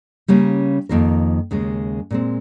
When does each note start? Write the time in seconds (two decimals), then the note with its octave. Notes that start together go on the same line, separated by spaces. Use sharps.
0.28 C#3 G3 A#3 C#4
0.89 F2 D#3 A#3 F4 A#4
1.51 D#2 C#3 G#3
2.11 A#2 G#3 C4